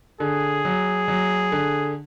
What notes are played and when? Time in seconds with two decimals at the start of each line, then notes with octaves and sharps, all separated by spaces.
0.20 D3 G#4
0.65 F#3
1.08 F#3
1.52 D3